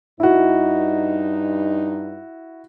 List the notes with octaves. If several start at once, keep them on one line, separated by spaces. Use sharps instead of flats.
G2 D#4 E4 F#4